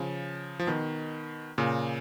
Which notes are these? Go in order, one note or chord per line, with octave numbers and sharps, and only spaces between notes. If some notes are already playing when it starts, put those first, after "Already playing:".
Already playing: C#3 F3
F3
B2 D#3
A#2 C#3